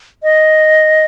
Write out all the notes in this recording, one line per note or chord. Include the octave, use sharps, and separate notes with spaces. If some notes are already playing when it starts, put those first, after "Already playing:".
D#5